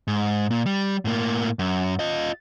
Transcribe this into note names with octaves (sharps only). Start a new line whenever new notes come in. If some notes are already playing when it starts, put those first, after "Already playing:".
G#2
A#2
G3
A2 A#3
F#2
F4 D#5